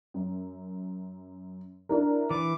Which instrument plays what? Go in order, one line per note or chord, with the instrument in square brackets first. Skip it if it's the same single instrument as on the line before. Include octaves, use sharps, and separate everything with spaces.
[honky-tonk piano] F#2
D4 E4 A#4
[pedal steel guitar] E3 [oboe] D6